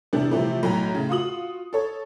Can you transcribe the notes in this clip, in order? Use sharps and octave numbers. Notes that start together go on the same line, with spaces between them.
C3 E3 G3 B3 D4
C3 E3 F3 A3 G4
B1 A2 G5 A#5
A2 C#3
F4 F#4 D#6 F#7
A4 C#5